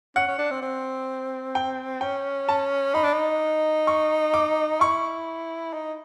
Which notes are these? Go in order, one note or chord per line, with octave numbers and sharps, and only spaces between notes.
C#4 F#5
C#4
D4
C4
C4
G5
C#4 G5
A5
D#4 B5
D4
D#4
C#6
D6
E4 C#6
D#4